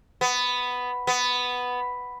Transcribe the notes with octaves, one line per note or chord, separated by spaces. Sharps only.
B3
B3